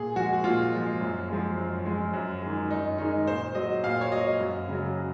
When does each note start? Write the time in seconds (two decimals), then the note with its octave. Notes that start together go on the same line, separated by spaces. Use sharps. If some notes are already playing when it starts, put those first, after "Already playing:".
Already playing: A#2 G#4
0.16 F3 G#3 F#4
0.44 A#2 F4
0.73 F3 G#3
1.01 F#2
1.29 F3 G#3
1.57 F#2
1.85 F3 G#3
2.13 F#2
2.42 D#3 G#3
2.71 F#2 D#4
2.98 D#3 G#3 D#4
3.27 A#2 C5
3.55 F#3 D#5
3.83 A#2 F5
4.01 C#5
4.12 F#3 D#5
4.40 F#2
4.68 C#3 F#3